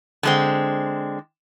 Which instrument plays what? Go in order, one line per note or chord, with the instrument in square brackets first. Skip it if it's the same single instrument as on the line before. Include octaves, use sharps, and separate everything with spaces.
[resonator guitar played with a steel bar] D3 G#3 C4